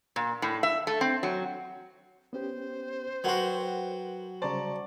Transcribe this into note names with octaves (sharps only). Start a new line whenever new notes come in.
A#2
A2
E5
A3
C4
F#3
B3 C#4 G4 C5
F#3 F#4 A#4 B4 F#5 G5 C6
C#3 G3 C5 D5 A5 A#5 C#6